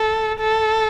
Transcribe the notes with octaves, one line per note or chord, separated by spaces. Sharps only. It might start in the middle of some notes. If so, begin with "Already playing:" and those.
Already playing: A4
A4